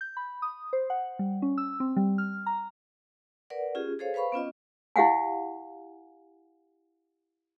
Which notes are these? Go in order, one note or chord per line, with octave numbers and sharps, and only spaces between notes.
G6
B5
D#6
C5
F#5
G3
C#4
E6
C4
G3
F6
A#5
A#4 B4 D5 F#5
C#4 F4 G4 G#4
G#4 A4 C5 C#5 F5
B4 C5 F5 B5 C#6
B3 C#4 F4 D#5
E4 G4 F5 F#5 G#5